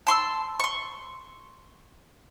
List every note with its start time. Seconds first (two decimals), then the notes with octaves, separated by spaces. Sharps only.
0.07 A5 C6 C#6 E6
0.60 C6 C#6